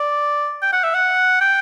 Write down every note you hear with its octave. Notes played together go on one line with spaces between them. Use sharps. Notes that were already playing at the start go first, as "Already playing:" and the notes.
Already playing: D5
G5
F#5
E5
F#5
G5